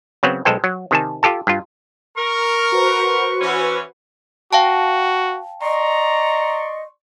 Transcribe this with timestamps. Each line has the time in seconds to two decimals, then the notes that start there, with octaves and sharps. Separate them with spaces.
0.23 C#3 F#3 B3 C4
0.45 B1 G#3 A4 C5 G5
0.64 F#3
0.91 C3 D#3 G#5 A5
1.23 F4 G4 A4 A5
1.47 G2 F4
2.17 A#4 C#6 F6
2.72 F#4 B4 C5
3.41 E3 C#4
4.53 F#4 F5 G5 A5
5.62 D5 D#5 A#5 C6 C#6